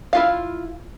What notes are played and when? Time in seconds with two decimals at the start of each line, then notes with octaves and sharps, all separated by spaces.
0.13 E4 F4 F5